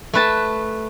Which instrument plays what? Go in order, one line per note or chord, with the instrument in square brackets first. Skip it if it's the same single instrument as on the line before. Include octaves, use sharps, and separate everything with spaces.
[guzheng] A3 B4 A5